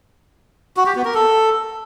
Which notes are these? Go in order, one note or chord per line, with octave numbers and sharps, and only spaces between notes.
F#4
G4
B3
A#4
A4